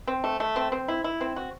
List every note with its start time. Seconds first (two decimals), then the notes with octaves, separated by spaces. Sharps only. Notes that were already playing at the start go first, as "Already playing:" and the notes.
0.07 C4
0.24 A3
0.40 A3
0.56 C4
0.72 C4
0.88 E4
1.04 E4
1.21 C4
1.36 F#4